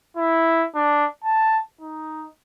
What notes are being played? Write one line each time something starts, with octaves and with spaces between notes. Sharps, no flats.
E4
D4
A5
D#4